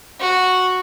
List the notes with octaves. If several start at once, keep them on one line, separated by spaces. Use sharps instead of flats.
F#4